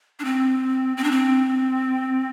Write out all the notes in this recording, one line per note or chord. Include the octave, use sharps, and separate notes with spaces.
D4
C4
C4
D4
C4